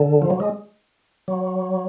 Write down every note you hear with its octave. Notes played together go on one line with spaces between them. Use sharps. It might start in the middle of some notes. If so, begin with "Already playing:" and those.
Already playing: D3
F3
F#3
G#3
F#3